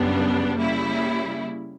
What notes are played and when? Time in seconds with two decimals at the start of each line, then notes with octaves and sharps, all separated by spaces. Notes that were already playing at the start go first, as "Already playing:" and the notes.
Already playing: F#2 C#3 G3 B3 D4
0.57 C#3 G3 A#3 E4